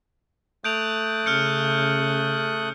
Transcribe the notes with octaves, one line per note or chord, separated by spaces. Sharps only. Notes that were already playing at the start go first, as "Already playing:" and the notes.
A3 D#6 F#6 G6 D7 F7
C#3 F6 G6 C#7